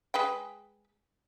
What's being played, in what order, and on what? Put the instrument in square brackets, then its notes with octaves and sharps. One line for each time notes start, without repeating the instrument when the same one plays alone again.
[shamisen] G#3 B4 G5